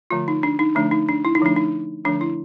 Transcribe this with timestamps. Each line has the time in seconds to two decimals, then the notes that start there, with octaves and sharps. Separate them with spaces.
0.11 D3 F3 A3 F4
0.28 D#4
0.43 D4
0.59 D#4
0.75 D3 F3 A3 D4
0.91 D#4
1.08 D4
1.25 E4
1.35 D#4
1.41 D3 F3 A3 D4
1.56 D#4
2.04 D3 F3 A3 D4
2.21 E4